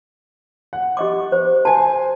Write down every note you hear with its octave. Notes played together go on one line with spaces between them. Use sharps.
F#5
G4 D#5 D6
C5
C5 G#5 A5